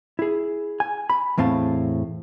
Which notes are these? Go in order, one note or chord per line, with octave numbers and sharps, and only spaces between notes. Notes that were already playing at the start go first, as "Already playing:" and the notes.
E4 G#4
G#5
B5
E2 A2 C4 F5 A5